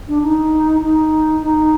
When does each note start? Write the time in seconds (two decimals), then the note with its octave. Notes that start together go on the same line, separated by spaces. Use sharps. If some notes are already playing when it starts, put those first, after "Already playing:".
0.08 D4
0.23 D#4
0.82 D#4
1.42 D#4